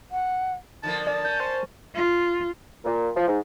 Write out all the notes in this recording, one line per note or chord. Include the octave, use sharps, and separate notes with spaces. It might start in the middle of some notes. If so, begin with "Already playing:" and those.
F#5
D3 F3 A#3 A5
D5 A5
C#4 G6
C5
F4
A#2
F3
G#2